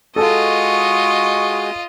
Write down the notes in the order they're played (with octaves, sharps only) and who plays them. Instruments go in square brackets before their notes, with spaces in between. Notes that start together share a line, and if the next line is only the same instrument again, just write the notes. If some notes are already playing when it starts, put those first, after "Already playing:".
[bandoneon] G#3 F#4 G#4 [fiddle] F4 D#5 [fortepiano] A4 A5 [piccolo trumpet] C#6